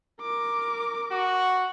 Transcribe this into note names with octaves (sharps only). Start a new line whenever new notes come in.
A#4 D6
F#4